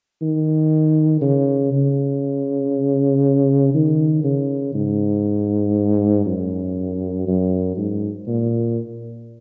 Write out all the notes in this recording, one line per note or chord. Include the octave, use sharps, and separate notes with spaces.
D#3
C#3
C#3
D#3
C#3
G#2
F#2
F#2
G#2
A#2